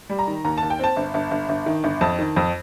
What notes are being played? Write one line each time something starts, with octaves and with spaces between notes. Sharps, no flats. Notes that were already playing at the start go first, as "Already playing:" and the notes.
G3
A#5
D#3
D#2 A#5
D#2 A5
G5
C4 A5
G1
G1
G1
G1
D#3
G1
F2 A5
D#3
F2